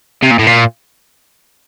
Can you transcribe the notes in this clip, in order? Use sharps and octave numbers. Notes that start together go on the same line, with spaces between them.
C3
A#2
A2
A#2